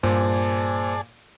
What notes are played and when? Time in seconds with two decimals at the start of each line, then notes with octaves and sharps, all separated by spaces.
0.03 G2 A#2 G#4 C5 D5 A5